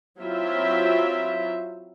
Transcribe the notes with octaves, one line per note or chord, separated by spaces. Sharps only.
F#3 C4 E4 F4 C5 E5